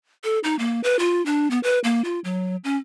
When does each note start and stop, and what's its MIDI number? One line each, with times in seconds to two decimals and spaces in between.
0.24 0.39 69
0.44 0.58 63
0.59 0.80 58
0.84 0.99 71
0.99 1.24 65
1.26 1.50 62
1.51 1.59 59
1.63 1.79 71
1.84 2.02 58
2.04 2.19 65
2.24 2.56 54
2.64 2.77 61